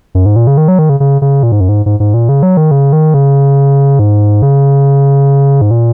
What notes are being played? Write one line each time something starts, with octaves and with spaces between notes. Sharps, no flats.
F#2
G#2
A#2
C#3
D#3
F#3
D#3
C#3
C#3
C#3
A#2
G#2
F#2
G#2
G#2
G#2
A#2
C#3
F#3
D#3
C#3
D#3
C#3
G#2
C#3
G#2
A#2